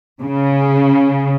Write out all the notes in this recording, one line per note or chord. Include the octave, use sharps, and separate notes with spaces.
C#3